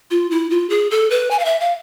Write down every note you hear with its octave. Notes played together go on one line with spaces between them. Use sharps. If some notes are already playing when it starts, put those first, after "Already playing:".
F4
E4
F4
G#4
A4
B4
G#5
F5
E5
F5